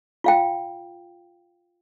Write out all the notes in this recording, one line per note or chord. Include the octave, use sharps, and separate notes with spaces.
F4 F5 G5